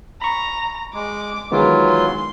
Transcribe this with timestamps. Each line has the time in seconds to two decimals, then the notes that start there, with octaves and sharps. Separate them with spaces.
0.22 A#5 B5 C#6
0.94 G#3 D6
1.52 D#3 E3 F#3 G#3 B3 F4
1.89 C6